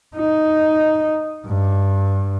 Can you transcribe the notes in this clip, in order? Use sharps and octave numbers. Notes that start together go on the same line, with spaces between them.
D#4
G2